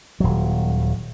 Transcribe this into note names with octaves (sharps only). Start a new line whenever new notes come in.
D#1 F#3